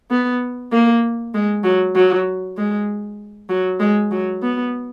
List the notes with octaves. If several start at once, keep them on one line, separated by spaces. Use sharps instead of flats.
B3
A#3
G#3
F#3
F#3
G#3
F#3
G#3
F#3
B3